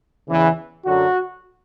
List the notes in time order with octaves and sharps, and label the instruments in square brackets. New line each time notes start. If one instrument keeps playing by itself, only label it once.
[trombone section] E2 C#3 E3
F#2 D3 F#3 F#4